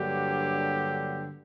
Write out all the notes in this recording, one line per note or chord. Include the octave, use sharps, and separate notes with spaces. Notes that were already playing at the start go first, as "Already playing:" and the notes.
Already playing: G2 D3 F#3 A#3 G4